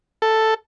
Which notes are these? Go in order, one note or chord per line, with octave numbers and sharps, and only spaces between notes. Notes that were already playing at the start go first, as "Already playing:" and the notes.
A4